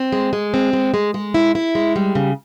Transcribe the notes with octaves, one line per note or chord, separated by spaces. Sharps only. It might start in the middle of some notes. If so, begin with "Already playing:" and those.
Already playing: C4
G#3
G#3
C4
G#3
G#3
G#3
E4
E4
G#3
G3
C#3